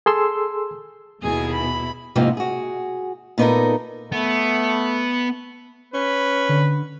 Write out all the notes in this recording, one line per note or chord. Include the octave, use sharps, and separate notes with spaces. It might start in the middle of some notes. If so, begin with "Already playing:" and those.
G#4 A4 C6 E6
D#2 B2 E4 G#4 G#5
B5
F2 G#2 C3 F3 A#3 D#4
F#4 G#4
A#2 B3 D#4 F#4 A4 A#4
A3 B3
C#4 B4
D3